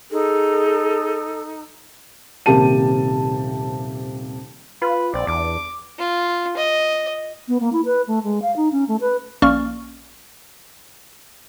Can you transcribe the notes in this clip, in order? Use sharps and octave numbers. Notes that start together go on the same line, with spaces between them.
D#4 G#4 A4
D#1 C3 A#3 G4 A5 D#7
F4 B4
A#1 C4 D5
E2 D4 D6
F4
D#5
B3
A#3
E4
B4
A3
G#3
F5
D#4
C#4
A3
B4
A#1 A#3 C#4 D5 C#6 F6